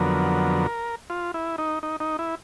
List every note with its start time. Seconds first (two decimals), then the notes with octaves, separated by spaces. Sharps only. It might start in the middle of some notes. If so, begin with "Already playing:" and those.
Already playing: F2 D3 F#3 B3 A#4
1.10 F4
1.34 E4
1.58 D#4
1.83 D#4
2.00 D#4
2.19 E4